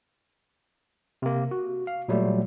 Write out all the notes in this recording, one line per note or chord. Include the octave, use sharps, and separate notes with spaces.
C3 A#3
F#4
F5
A#2 F#3 G3 A3